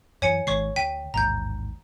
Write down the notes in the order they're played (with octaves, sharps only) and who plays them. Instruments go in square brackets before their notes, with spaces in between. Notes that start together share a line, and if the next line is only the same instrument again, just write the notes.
[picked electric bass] F#2 E3 [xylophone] C#5 G#5 C#7
[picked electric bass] G#1 D#3 G#3 [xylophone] C#5 C#6 C7
[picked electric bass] D2 [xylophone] G5 B6 D#7
[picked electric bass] A1 D#2 G#2 [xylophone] A#5 G6